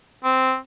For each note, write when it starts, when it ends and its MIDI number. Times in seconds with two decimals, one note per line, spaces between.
0.24 0.56 60